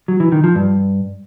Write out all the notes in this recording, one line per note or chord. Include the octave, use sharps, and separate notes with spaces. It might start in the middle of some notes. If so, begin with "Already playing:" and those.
F#3
E3
D#3
F3
G2